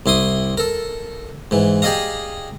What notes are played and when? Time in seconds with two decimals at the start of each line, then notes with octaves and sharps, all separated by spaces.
0.06 C2 E4 C6 D#6
0.58 A4 A#4
1.51 G#2 E3
1.82 G4 G#4 D5 D#5 F5 A#5